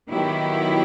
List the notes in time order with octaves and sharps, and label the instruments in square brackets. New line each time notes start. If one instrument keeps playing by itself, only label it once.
[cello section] D#3 F#3 B3 E4 G4